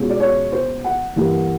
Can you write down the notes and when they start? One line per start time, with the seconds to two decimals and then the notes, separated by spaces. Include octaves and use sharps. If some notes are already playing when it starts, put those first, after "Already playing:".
Already playing: B2 G#3 C#4 F4
0.10 D5
0.20 C#5
0.52 C5
0.84 F#5
1.16 G2 E3 G3 A#3